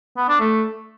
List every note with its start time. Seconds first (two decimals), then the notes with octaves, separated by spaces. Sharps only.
0.17 B3
0.28 D4
0.40 A3